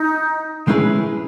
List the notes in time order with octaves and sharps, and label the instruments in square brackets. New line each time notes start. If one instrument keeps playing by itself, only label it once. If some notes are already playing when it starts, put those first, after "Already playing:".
Already playing: [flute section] D#4
[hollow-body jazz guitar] G#3 C#4 E4 G#4 B4